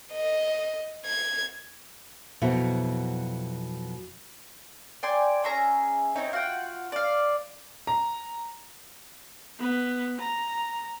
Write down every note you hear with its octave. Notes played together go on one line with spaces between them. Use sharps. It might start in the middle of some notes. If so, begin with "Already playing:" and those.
D#5
G#6
F2 B2 F#3 E4
D5 G5 G#5 C6
C#4 G#4 E5 A#5
C4 D#4 E4 C#5
F4 F#4 F#5 G5
D5 F5
A#5
B3
A#5